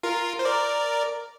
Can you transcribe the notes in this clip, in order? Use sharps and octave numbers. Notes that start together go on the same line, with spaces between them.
F4 A#4
C5
A#4 D5